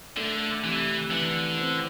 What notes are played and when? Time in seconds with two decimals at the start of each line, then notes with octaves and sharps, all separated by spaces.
0.17 D3 A3
0.64 C3 E3
1.11 D3 E3
1.58 C4